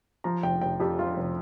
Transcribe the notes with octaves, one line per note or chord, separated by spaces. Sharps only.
F3 A#5
F1 G5
F1 G5
F2 G4
F3 F4
F1